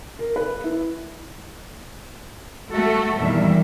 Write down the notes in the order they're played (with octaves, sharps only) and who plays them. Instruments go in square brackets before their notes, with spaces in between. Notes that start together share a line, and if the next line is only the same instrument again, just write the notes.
[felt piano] A#4
B4
E4
[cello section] A3 F#4 A4
E2 A#2 D#3 E3 G3 E5